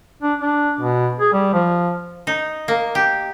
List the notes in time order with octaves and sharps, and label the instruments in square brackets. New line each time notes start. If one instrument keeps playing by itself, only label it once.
[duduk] D4
D4
B2
G#4
G3
F3
[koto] D#4
A#3
G4